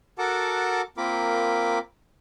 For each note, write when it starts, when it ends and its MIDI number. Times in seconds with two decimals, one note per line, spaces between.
0.18 0.82 66
0.18 0.82 69
0.18 0.82 70
0.18 0.82 78
0.18 0.82 81
0.18 0.82 86
0.98 1.79 58
0.98 1.79 60
0.98 1.79 65
0.98 1.79 70
0.98 1.79 83
0.98 1.79 86